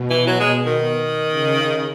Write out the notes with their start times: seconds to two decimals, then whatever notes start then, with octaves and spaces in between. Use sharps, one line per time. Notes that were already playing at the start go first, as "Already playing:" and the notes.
Already playing: B2
0.10 E3
0.27 F#3
0.40 G#3
0.66 D#3
1.30 C#3